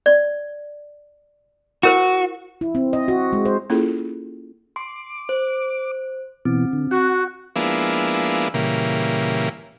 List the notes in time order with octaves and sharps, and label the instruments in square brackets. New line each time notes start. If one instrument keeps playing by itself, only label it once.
[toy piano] D5
[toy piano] E4 A#4 C5 [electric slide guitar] F#4
[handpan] E4
C4
D#5
F#4
G#3
C5
[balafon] A#3 C#4 E4 F4 G#4 A4
[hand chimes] C6 [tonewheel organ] D6
[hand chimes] C5
[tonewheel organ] B2 E3 [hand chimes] C4
[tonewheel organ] D3
[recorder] F#4 [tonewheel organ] F#5
[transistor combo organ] F3 G#3 A#3 B3 D4 E4
A#2 C#3 E3 G3 A#3